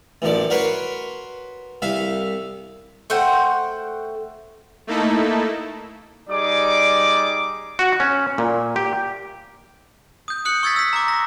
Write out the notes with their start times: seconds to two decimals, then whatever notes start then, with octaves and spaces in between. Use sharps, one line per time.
0.22 A1 F#2 F3 D5
0.50 F#4 A#4 B4 C#5 C6 C#6
1.82 C2 E5 F5
3.10 A3 C5 F#5 G5
4.87 A3 A#3 D#4 E4 A4
6.30 G3 D#4 G#4 D5 D6
7.79 F#4
8.00 C#4
8.38 A#2
8.76 G4
10.28 D#6 G6
10.45 D#6 F#6 C#7 F#7
10.63 C#6 E6 G#6 A6 B6
10.76 E6 B6
10.93 A#5 D6
11.08 A#6